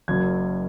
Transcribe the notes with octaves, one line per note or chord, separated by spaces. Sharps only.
F#1 F#2 F#3 G#6